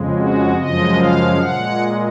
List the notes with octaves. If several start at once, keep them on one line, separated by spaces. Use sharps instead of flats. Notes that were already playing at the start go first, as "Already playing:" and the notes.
Already playing: F2 C#3 G#3
F#4
F#2 C#3 F3 G#3 D#5
F5
A#2 G#3 F#5